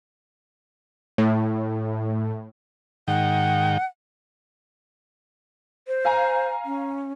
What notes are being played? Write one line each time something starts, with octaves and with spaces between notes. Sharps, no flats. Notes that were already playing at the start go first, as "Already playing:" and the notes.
A2
G#2 D#3 F#5 G5
C5
F5 G#5 A#5
C#4